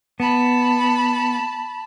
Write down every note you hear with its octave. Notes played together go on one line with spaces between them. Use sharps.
B3 A5 B5